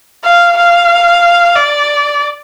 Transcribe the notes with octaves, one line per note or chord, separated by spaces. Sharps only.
F5
F5
D5